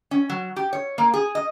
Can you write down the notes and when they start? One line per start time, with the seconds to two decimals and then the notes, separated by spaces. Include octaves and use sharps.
0.11 C#4
0.30 F#3
0.56 G4
0.73 C#5
0.98 A#3
1.14 G#4
1.35 D#5